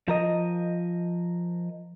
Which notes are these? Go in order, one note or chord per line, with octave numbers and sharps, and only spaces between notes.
F3 A#4 D#5